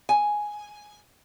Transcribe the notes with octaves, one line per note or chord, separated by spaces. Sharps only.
G#5